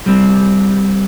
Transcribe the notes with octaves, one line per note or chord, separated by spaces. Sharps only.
G3 C4